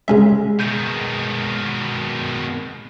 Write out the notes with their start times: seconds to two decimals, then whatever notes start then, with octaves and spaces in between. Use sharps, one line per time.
0.08 C#3 G#3 C#4 E5
0.60 B2 D#3 G6 D#7